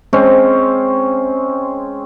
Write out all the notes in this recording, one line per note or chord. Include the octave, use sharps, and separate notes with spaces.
G#3 C4 C#4